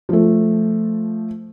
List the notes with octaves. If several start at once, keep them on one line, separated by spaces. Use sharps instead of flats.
F3 A3